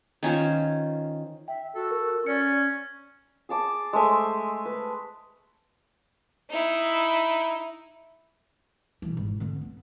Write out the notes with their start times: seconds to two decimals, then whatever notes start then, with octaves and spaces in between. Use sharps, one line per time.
0.23 D#3 C#4 F4 C5
1.48 E5 G5
1.75 F#4 A4
1.91 A#4
2.26 C#4 D5 C#7
3.49 G#4 A5 D6
3.93 G#3 A3 C5 E5
4.65 B4
6.51 D#4 E4
9.02 B2 E3
9.17 G#1
9.40 D3 C4
9.62 B3